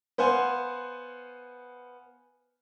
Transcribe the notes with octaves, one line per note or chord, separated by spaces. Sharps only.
B3 C5 F5 F#5 G#5